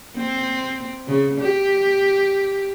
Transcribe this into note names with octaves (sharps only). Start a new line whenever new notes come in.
C4
C#3
G4